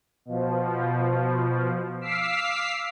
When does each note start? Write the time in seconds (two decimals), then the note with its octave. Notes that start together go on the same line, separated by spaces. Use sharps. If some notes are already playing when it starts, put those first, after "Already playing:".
0.25 B2 F3
2.01 F5 D6 E6 B6 C7